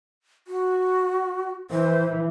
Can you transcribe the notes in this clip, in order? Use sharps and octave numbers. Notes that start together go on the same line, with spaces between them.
F#4
E3 C5